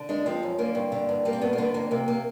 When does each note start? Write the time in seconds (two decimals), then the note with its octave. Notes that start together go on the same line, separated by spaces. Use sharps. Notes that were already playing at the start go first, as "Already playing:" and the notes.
Already playing: D3
0.09 G#3 D4
0.26 F3 C4
0.43 F#2
0.58 D3 A#3
0.75 G2
0.92 D3
1.09 G2
1.25 G3 A#3
1.33 C4
1.41 G2 B3
1.53 A#3
1.58 D3 B3
1.74 F2 A#3
1.91 C3 A#3
2.08 A#3